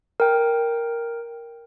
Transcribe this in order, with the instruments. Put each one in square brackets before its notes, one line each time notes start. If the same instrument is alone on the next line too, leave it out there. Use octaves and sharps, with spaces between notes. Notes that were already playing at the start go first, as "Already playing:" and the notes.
[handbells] A#4 G5